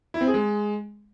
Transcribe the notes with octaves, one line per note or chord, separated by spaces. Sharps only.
E4
C4
G#4
G#3